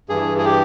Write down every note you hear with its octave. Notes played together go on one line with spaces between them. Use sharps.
G2 E3 G#4
G#4
G4